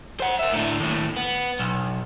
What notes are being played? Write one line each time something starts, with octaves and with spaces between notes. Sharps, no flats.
C5 F#5
A#4 E5
A2 D3
D#2 A2
B3
B1